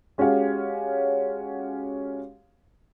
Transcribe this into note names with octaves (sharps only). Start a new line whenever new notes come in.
G#3 C#4 F#4 G4 C#5 F5